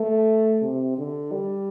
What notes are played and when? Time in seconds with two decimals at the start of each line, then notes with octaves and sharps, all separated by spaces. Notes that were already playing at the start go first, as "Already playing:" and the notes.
Already playing: A3
0.62 C3
0.98 D3
1.32 G3